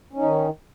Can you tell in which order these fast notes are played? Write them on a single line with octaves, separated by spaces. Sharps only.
C#4 D#4 D#3